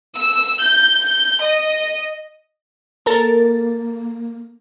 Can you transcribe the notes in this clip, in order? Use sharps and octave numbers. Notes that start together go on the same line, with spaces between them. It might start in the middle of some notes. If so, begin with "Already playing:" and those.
E6
G6
D#5
A#3 A4 A#4 A6